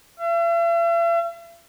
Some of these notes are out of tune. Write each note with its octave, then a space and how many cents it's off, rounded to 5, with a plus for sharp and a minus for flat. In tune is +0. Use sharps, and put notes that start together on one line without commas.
E5 +45